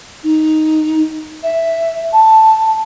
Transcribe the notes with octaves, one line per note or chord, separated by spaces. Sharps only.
D#4
E5
A5